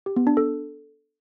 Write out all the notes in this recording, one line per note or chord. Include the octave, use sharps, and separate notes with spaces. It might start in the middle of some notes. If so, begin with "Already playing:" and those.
G4
B3
D4
A4